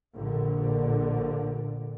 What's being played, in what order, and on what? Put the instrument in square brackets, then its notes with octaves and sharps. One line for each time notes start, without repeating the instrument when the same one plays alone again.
[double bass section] A#1 D3